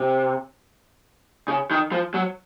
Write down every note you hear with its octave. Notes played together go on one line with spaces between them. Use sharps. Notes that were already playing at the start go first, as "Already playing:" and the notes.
Already playing: C3
C#3
D#3
F3
F#3